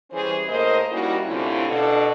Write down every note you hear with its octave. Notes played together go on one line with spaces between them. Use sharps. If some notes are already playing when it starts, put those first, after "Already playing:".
E3 G3 C#4 G#4 C5
A2 A#3 A#4 C5 D#5
G3 A#3 C#4 D#4 E4 F#4
D2 C3 C#4 D4 E4 F4
B2 D4 A4